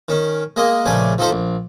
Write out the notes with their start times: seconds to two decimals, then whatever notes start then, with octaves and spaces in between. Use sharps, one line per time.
0.08 D#3 C#4
0.56 G#3 A#3 D#5
0.86 A#1 C#3 A3 D5 G#5
1.18 F3 D#4 G4 A4 C5
1.31 A#1